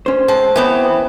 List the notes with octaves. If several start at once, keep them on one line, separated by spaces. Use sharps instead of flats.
C#4 C5
G#3 C4 A5
E3 B3 C4